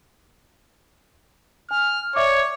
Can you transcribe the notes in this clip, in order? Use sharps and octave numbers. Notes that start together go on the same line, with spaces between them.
G#5 F6
C#5 D5 E5 D6